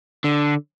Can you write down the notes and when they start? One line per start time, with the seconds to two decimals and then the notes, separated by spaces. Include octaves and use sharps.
0.24 D3